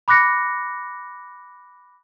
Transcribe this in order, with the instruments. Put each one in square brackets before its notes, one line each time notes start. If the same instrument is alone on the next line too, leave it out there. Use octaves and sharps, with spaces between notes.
[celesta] B5 D6 F#6 A#6 C#7